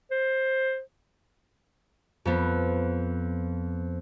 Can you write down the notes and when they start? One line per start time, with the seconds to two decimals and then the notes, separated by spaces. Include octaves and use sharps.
0.11 C5
2.25 F2 B3